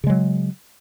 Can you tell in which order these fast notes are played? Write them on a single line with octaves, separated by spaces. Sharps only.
C#3 G#3 F#3